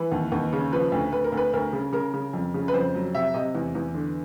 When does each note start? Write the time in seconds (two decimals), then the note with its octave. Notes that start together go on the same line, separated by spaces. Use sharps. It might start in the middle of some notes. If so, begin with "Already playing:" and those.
Already playing: E3 B4
0.12 D#2
0.32 D#2
0.53 C#3
0.73 F3 B4
0.92 D2
1.12 D2 B4
1.24 A#4
1.32 D2
1.37 B4
1.53 D2 A#4
1.73 C#3
1.93 C#3 A#4
2.14 C#3
2.33 F2
2.54 C#3
2.68 B4
2.73 F2 C5
2.94 F#3
3.15 C3 E5
3.34 C3 D#5
3.55 E2
3.75 E2
3.94 D3